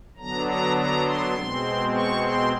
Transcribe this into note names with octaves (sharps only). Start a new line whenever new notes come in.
D3 F#3 B3 D4 A#5
A#5
A#5
C6
B2 G#3 C4
C#6
C6